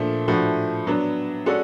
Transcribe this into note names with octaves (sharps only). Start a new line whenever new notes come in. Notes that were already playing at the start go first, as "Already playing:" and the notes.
Already playing: A#2 F3 A3 D4
A2 F3 A3 D4 F#4
F#3 B3 D4
G#3 C#4 F#4 A4 D5